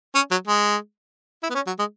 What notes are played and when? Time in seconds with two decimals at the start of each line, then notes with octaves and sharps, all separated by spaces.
0.15 C#4
0.31 F#3
0.47 G#3
1.43 E4
1.50 B3
1.55 C#4
1.67 F#3
1.79 G#3